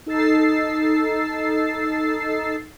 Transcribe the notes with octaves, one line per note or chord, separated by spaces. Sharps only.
D#4 A4 E6 A6 C7